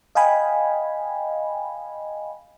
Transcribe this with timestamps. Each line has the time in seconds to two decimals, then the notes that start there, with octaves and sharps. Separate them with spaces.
0.15 D#5 F5 G5 G#5 B5